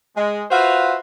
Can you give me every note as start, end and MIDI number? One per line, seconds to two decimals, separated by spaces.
0.16 0.42 56
0.50 0.96 65
0.50 0.96 66
0.50 0.96 71
0.50 0.96 72
0.50 0.96 76
0.50 0.96 77